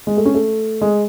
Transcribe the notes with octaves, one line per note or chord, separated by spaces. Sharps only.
G#3
A3
C#4
A3
G#3